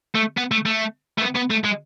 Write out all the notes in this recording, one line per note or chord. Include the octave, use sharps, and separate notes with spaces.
A3
B3
A3
A3
A3
B3
B3
A3
G#3